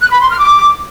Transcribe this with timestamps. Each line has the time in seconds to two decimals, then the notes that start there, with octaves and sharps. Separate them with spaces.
0.01 F#6
0.11 B5
0.20 C6
0.30 F6
0.40 D6